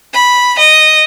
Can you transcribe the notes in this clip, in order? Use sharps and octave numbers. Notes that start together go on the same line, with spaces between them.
B5
D#5